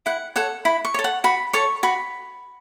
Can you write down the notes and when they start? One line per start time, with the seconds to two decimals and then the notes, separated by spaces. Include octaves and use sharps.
0.06 E4 F#5
0.36 A4 C#5 F#5
0.65 E4 B5
0.85 C#6
0.94 A4 C#5
1.04 F#5
1.24 F#4 B5
1.53 A4 C#5 C#6
1.83 F#4 B5